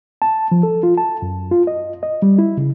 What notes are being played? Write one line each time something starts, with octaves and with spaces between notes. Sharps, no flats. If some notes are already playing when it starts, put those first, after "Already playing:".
A5
F3
A4
F4
A5
F#2
F4
D#5
D#5
G3
E4
C#3